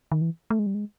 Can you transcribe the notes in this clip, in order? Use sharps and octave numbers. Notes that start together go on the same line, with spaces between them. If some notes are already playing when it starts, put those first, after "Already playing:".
D#3
E3
A3
G#3
G3
G#3